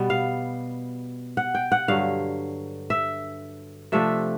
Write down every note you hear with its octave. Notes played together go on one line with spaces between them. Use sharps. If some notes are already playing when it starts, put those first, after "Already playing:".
Already playing: B2 G3 B3
F5
F#5
G5
F#5
G2 D3 F#3 F5
E5
C3 F3 A3 D4 E5